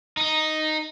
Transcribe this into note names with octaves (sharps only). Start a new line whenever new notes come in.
D#4